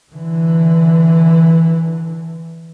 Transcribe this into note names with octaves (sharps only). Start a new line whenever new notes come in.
D3 E3